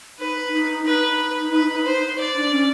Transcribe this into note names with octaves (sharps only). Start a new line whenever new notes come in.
D#4 B4
D#4
D#4 B4
B4
C5
D5
D4
C#4